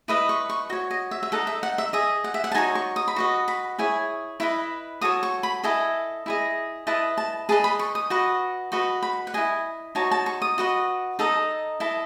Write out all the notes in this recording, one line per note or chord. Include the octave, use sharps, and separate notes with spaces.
E4 B4 D#5 D#6
C#6
C#6
F#4 C#5 D#5
D#5
E5
E5
D#4 A4 D#5 F#5
E5
F#5
E5
G#4 D#5 E5
F#5
E5
F#5
A5
D#4 F#4 C#5 G#5
C#6
D#6
B5
F#4 B4 D#5 C#6
B5
E4 G#4 C#5 G#5
E4 B4 D#5 B5
F#4 A4 C#5 D#6
C#6
B5
E4 A4 D#5 G#5
E4 G#4 D#5
E4 B4 D#5 A5
A5
G#4 B4 D#5 A5
B5
C#6
D#6
F#4 B4 D#5
F#4 B4 D#5 C#6
B5
F#5
E4 G#4 D#5 G#5
D#4 F#4 C#5 A5
A5
C#6
D#6
F#4 B4 D#5
D#4 A4 D#5
E4 A4 D#5